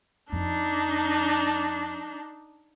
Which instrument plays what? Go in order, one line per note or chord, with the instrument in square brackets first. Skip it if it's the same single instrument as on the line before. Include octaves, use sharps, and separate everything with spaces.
[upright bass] F2 [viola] D4 D#4